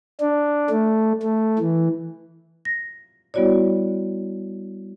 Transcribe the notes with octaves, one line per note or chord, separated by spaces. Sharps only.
D4
A3
A3
E3
A#6
G3 B3 E4 F#4 C#5 D5